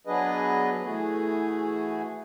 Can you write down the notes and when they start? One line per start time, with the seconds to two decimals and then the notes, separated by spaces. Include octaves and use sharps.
0.07 F#3 B3 D4 G#4 B4 D#5
0.84 E3 A3 F#4 G#4